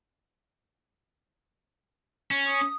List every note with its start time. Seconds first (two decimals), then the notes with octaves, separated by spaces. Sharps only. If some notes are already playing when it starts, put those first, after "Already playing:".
2.31 C#4
2.46 D#6